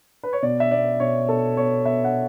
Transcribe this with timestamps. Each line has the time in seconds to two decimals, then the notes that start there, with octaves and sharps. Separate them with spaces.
0.23 B4
0.33 C#5
0.42 B2 D5
0.60 E5
0.71 B3 D5
1.00 B2 C#5
1.28 B2 A4
1.57 B3 C#5
1.85 B3 E5
2.04 F#5